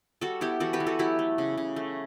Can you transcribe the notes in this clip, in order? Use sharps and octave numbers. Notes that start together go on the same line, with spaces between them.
G3 F#4 A4
B3 E4 G4
E3 F#4 A4
G4 B4
E3
F#4 A4
F#3 E4 G4
A3
C#3
C#3
A3